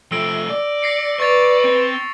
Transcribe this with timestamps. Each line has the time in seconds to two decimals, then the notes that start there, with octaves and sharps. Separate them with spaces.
0.12 F3 A3 E6 A#6 D7
0.49 D5
0.83 A#6 C7 C#7
1.20 B4 D5 C#6 A6 F7
1.64 C4